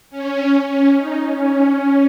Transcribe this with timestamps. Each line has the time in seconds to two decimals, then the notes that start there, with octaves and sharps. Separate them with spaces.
0.10 C#4
0.68 C#4
0.97 D#4
1.25 C#4